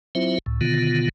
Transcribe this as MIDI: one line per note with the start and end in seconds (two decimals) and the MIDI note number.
0.15 0.38 54
0.15 0.38 60
0.15 0.38 64
0.15 0.38 65
0.15 0.38 72
0.15 0.38 76
0.46 0.61 37
0.46 0.61 45
0.61 1.09 47
0.61 1.09 50
0.61 1.09 51
0.61 1.09 59
0.61 1.09 65